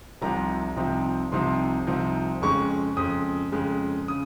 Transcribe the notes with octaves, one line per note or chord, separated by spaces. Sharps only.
C2 C3 F3 C4 D#4 A#5
C2 C3 F3 C4 D#4
C2 C3 F3 C4 D#4 C6
C2 C3 F3 C4 D#4
F2 C#3 G#3 C#6
F2 C#3 G#3 D#6
F2 C#3 G#3
C#3 D#6